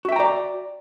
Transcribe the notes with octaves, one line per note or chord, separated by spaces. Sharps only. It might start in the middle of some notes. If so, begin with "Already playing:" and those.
F#4 D5 E5 G5 A#5